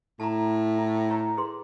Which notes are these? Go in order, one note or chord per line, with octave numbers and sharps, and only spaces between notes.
A2 A5 A#5
E4
E4 C#5 A#5
G#4 B4 C6